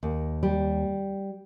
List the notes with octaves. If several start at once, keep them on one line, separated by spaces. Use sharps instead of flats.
D#2
G3